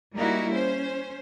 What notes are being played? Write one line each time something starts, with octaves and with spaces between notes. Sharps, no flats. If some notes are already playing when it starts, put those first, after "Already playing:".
G3 A#3 D#4 E4 F#4
C#4 C5